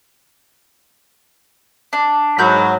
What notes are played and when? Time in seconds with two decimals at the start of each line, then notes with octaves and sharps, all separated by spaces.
1.93 D4
2.39 G#2 F#3 A#4 B5 G6